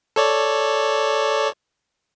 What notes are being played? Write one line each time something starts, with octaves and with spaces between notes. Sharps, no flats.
A4 C#5 D5